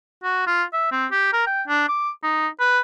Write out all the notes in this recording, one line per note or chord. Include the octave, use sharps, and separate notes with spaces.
F#4
F4
E5
C4
G4
A#4
G5
D4
D6
D#4
B4